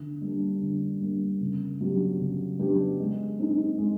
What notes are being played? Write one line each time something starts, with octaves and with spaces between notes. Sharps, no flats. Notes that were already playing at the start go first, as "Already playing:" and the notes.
Already playing: D3
G3 A#3 D4
D3
G3 A#3 D4
C#3
F#3 B3 D4 G4
C#3
F#3 B3 D4 G4
G#3
C4 D#4
G#3